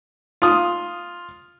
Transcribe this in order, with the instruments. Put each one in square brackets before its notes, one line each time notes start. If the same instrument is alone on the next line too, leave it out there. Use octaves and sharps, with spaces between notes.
[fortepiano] F4 D#6